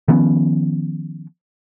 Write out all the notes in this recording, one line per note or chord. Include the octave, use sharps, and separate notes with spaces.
D#3 F3 B3 C#4